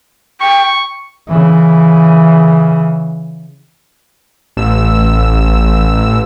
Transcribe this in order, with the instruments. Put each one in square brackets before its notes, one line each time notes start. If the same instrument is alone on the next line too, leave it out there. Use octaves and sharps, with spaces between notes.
[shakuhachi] G5 [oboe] C#6
[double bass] C#3 E3
[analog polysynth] A1 E6